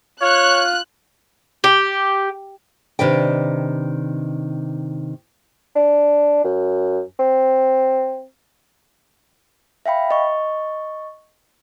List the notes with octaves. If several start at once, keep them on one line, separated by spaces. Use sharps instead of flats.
F4 C#5 F#6
G4
C3 D#3 D4 B4 G5
D4
F#2
C4
E5 F5 G5 B5
D#5 C#6